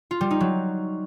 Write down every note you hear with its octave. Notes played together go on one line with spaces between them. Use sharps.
F4
G3
D#4
F#3